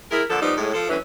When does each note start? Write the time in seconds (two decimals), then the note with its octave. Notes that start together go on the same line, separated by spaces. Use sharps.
0.10 G#3 E4 A#4
0.30 A#2 D3 F3 A4
0.42 F3 G3 B3 D#4
0.57 A2 G#3
0.73 F3 A4
0.89 D2 E3 F#3 C#4